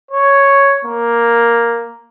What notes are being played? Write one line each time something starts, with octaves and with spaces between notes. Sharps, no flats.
C#5
A#3